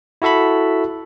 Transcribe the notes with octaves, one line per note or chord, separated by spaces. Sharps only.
E4 F#4 A4 E5 B5